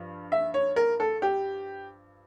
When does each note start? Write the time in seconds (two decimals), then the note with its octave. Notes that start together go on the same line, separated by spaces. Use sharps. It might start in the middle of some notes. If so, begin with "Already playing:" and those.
Already playing: G2 F3
0.32 E5
0.54 C#5
0.76 A#4
1.00 A4
1.22 G4